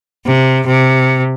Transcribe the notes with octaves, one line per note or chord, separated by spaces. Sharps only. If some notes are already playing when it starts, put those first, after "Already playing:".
C3
C3